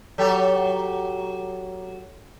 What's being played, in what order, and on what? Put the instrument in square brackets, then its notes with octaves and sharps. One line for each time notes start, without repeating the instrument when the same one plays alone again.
[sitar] F#3 G4 A4